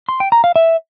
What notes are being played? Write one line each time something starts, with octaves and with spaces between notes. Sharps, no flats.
C6
G5
A#5
F5
E5